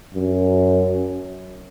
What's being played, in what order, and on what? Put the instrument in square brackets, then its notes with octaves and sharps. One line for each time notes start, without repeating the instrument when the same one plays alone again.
[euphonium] F#2